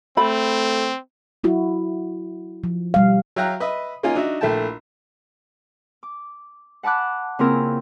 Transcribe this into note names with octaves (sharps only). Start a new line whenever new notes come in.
A3 C4 B5
F#3 E4 F#4
F3
B2 G3 F5
F#3 E5 F5 G5 A#5 F#6
B4 D#5 E5
A#3 C#4 D#4 F4 A#4 G#5
D4 D#4 F#4 E5
A#1 A3 E4 G5 A5
D6
F#5 A5 B5 D6 F#6
C#3 A#3 C4 E4 F4 A#4